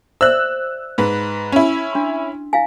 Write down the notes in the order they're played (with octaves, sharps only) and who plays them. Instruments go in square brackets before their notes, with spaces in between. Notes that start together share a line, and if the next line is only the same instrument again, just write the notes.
[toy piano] C5 D5 E5 [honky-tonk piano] E6 F#6
[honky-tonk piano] G#2 B4
C#4 E4
[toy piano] D4 C6
E4 F5 G#5